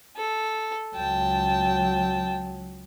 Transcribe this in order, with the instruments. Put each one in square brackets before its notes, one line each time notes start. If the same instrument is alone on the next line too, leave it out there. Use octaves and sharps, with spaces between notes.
[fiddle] A4
[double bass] C#2 F#3 [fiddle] G5 A5